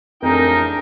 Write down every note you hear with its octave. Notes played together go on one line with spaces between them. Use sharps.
A1 F2 D4 D#4 G#4 A#4 G5